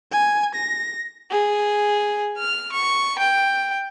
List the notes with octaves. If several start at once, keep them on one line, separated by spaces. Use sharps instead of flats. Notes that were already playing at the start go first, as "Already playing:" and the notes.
G#5
A#6
G#4
F6
C#6
G5